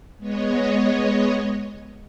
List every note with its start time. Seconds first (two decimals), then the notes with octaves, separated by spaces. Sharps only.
0.18 G#3 B3 C#5 D#5